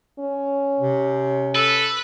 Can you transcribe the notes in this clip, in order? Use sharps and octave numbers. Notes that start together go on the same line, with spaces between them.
C#4
C3
A4 B4